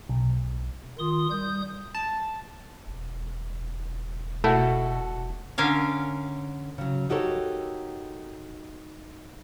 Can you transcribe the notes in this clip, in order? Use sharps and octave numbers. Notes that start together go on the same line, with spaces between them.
B1
D#3 F4 C6 D#6
G3 D#6 G6
A5
E1
B2 A3 E4 F#4 A4
D3 C#4 A#4 F5
C#3 F#3
D#4 F#4 G4 A4 A#4 C#5